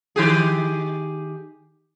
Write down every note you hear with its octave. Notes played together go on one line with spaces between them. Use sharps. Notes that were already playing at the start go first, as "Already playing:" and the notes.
D#3 G4 G#4